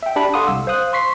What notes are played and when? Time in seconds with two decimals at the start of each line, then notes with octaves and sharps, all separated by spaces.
0.03 E5 G5
0.16 D4 G4 A5 B5
0.34 A4 F5 F#5 C6 D6 D#6
0.47 C2 E6
0.67 C5 F5 D#6 F#6
0.93 C6 C#6 B6 C7